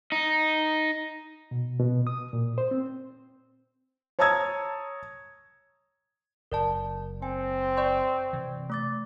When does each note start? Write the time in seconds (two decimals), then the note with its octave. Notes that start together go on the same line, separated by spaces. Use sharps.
0.12 D#4
1.51 B2
1.80 B2
2.07 D#6
2.33 A#2
2.58 C5
2.71 C4
4.19 C#5 A5 A#5 D#6 E6 G#6
6.52 F#1 A#4 D5 A5
7.22 C4 G#5
7.77 D5 C6 C#6
8.33 C3 E3
8.70 A3 D6 A6